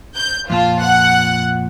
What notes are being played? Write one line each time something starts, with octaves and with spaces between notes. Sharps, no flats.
G6
F2 A#2 F4 A5
F#5